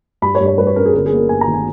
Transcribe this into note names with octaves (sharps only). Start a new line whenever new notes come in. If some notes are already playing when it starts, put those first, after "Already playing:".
G2 B5
C#5
G2
C#5
G3 B4
C#5
C#4 A#4
G#4
G1 A#4
G#4
A#3
A#4
G2 G#5
A#5
D#3
G#5